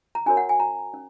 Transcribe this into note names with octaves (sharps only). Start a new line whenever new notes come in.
A#5
C#4 F#4 A#4 C#5 G#5
F#5
G#5
A#5
C#4